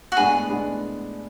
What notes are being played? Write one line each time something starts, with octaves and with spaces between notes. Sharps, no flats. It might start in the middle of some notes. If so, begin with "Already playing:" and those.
F#4
A2 G#3 B3 D4 G#4
A2 G#3 B3 D4